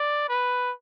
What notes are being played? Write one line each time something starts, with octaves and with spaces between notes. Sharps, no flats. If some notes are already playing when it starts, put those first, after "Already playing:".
Already playing: D5
B4